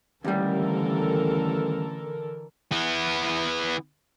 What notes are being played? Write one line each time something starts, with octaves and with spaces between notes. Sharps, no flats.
A1 D#2 D3 E3 G3 A4 A#4
E3 B3